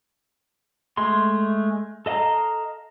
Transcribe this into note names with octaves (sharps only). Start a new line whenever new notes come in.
G#3 A3 C6
A4 D#5 F5 A#5